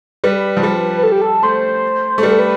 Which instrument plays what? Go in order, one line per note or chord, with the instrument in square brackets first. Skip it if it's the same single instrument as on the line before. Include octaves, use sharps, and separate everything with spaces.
[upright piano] G3 [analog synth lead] B4
[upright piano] F3
G3
[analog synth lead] A4
G4
A4
[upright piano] A3 [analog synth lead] C5
[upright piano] A3
[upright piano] G3 [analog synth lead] B4
[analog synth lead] A4
B4